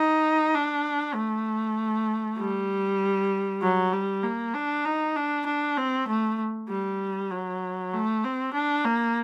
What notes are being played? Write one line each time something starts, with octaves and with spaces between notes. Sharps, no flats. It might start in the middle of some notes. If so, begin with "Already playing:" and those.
Already playing: D#4
D4
A3
G3
F#3
G3
A#3
D4
D#4
D4
D4
C4
A3
G3
F#3
A3
C4
D4
A#3